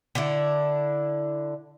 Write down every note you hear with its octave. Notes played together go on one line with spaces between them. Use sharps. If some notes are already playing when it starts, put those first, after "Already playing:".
D3 D4 E4